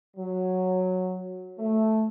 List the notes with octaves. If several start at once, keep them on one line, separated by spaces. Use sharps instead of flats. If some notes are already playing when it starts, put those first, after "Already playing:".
F#3
A3